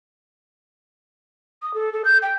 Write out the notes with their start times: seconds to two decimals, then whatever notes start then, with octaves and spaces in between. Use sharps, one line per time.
1.62 D#6
1.74 A4
1.93 A4
2.05 G6
2.22 G5